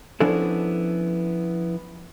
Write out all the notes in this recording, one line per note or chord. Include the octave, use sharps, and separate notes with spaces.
F3 B3 C#4 D4 E4 A4